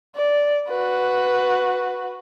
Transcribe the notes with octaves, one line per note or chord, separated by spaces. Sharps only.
D5
F#4 B4